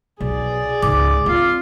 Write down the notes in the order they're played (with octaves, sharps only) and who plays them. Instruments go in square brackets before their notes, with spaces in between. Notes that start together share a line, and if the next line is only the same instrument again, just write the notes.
[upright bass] B1 [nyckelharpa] G#4 D5
[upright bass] C#2 G#2 [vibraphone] D6
[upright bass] C4 [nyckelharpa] F4 F5